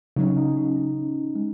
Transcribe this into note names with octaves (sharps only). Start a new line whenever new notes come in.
C#3 F#3 C#4 D#4
D#4
D#4
C#4
G#3